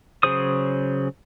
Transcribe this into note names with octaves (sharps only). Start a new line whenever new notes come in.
C#3 F#3 G#4 C5 D#6